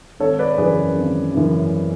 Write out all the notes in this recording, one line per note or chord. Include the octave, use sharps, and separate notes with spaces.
G#1 A4 C#5
B4 D5
F#2 C#3 E3 G#4 B4
G#1
F#2 C#3 E3